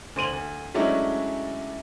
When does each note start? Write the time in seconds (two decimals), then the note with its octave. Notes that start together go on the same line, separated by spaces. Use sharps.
0.16 D2 C5 D#7 F#7
0.33 D2
0.74 F#3 G#3 A3 C#4 D4 E4